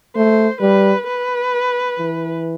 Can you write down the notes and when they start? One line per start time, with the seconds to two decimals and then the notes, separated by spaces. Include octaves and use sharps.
0.16 A3 C5
0.61 G3 B4
1.07 B4
1.98 E3